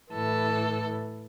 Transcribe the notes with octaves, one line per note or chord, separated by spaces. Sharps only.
A2 E3 A4